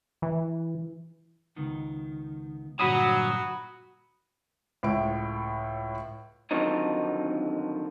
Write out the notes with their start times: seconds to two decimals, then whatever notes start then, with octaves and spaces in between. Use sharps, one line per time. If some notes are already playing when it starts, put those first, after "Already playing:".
0.22 E3
1.56 C#2 D#3 B3
2.79 G2 A#2 D3 F#3 F#4 B5 D#6
4.83 C#2 A2 E4 D7
6.51 F2 D3 D#3 F3 F#3 D#4